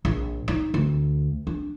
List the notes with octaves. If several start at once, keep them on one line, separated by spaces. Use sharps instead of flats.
A#1
D#4
D2
D4